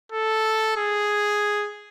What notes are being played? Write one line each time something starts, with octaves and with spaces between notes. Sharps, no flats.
A4
G#4